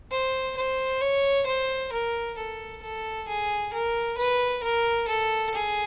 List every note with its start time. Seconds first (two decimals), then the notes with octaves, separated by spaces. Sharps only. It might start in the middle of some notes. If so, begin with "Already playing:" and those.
0.11 C5
0.57 C5
1.01 C#5
1.47 C5
1.92 A#4
2.37 A4
2.83 A4
3.28 G#4
3.73 A#4
4.18 B4
4.63 A#4
5.08 A4
5.54 G#4